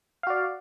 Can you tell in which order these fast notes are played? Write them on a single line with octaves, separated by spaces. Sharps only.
F5 F#4 D5